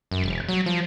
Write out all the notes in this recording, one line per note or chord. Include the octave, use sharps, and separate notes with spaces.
F#2
E1
F#3
F3